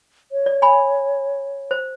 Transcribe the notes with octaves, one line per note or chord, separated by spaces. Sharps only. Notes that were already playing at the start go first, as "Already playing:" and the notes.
C#5
D5
G#5 B5
C5